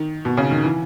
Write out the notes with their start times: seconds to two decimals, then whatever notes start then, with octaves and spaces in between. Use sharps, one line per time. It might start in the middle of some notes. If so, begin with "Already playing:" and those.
Already playing: D#3
0.25 B2
0.37 C#3
0.51 D#3
0.63 E3